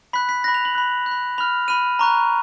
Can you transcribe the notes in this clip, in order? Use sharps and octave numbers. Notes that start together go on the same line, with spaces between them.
B5 F#6 B6
B6
B5 F#6 A#6
F7
F#7
B5 F#6
F#6
B5
B5 F6 F7
B5 F6 D#7
A#5 C#6 F#6